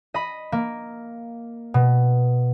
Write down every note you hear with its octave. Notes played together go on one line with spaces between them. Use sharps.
D#5 B5
A#3
B2